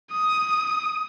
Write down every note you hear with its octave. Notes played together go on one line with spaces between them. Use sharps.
D#6